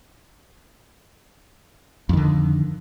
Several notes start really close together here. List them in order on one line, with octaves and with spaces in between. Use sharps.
F2 D#3 D3